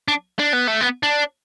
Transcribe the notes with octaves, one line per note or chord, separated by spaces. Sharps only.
D4
D4
B3
A3
B3
D4